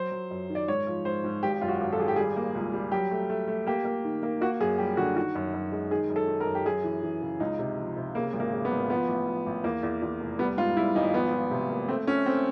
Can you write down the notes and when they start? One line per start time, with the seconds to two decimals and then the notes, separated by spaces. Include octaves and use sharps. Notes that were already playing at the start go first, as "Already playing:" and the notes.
Already playing: F#3 C5
0.11 F#3
0.31 F#2
0.50 D#3
0.55 D5
0.68 G#2 C#5
0.87 F3
1.05 G#2 C5
1.24 G#2
1.43 G#1 G4
1.61 F#2 F4
1.68 F#4
1.81 G#1
1.93 A4
1.99 G#1 G#4
2.08 G4
2.16 G3 G#4
2.36 A#3
2.55 C#2
2.73 G3
2.92 F#3 G4
3.11 A3
3.29 A3
3.48 A3
3.67 A#3 G4
3.85 A#3
4.04 D#3
4.23 A#3
4.41 A#3 F#4
4.60 F#2 G#4
4.78 G3 G4
4.97 D3 F#4
5.16 D#3 F#4
5.35 F#2
5.54 F#2
5.72 G#3
5.91 D#3 G#4
6.10 F#2
6.16 A4
6.28 D#3
6.40 A#4
6.47 F#2
6.55 G4
6.66 F#2 G#4
6.84 E3
7.03 E3
7.22 C#3
7.40 C#2 D#4
7.59 C3
7.77 F3
7.97 C3
8.15 C#3 A#3
8.33 G#1
8.40 A#3
8.52 C#3
8.65 B3
8.71 G#1
8.90 F3 B3
9.08 A1
9.27 F3
9.46 A1
9.64 E2 A#3
9.83 E2
10.02 E2
10.21 F1
10.39 G3 B3
10.57 G#2 F4
10.77 G3 E4
10.95 G#1 D#4
11.14 F3 B3
11.33 F3
11.51 C3
11.70 A#3
11.88 A3 C4
12.07 A3 C#4
12.26 A3 C4